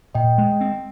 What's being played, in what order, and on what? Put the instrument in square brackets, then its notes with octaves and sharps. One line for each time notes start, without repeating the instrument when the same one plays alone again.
[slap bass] A#2 [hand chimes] D#5 G5
[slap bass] G#3
C4